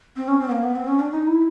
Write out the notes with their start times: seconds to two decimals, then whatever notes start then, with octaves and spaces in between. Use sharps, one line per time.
0.16 C4
0.28 C#4
0.40 C4
0.48 B3
0.51 A#3
0.63 B3
0.75 C4
0.87 C#4
0.99 D4
1.11 D#4
1.27 E4